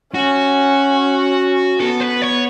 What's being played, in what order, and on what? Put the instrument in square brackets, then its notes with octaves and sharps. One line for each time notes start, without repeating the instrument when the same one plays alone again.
[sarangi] C#4 [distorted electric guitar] F#4
[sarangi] B3 [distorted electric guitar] A4
[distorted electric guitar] B4
C#5